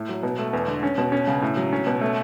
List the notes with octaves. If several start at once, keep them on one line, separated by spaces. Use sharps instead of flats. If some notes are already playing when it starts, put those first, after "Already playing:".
Already playing: A2
F#3
B2
A3
E2
D3
C#4
B2
C#4
C#3
A2
F#3
C#4
B2
A3